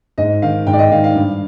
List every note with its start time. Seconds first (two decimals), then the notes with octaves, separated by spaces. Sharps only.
0.18 G#2 D#5
0.42 D#3 F5
0.67 G#2 G5
0.73 D5
0.79 D#5
0.92 D#3 F5
1.04 F5
1.15 G2